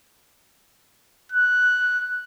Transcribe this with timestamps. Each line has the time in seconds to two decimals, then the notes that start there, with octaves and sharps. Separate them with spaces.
1.32 F#6